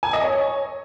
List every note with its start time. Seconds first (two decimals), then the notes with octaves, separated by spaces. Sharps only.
0.03 G#5
0.13 D#5
0.24 C#5